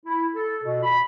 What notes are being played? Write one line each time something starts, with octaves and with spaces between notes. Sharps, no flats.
E4
A4
B2
B5